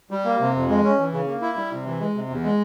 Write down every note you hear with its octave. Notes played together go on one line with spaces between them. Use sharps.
G3
A#3
C3
F2
G#3
C#4
E3
C#3
A#3
E4
G3
C3
E3
G#3
C3
E2
G#3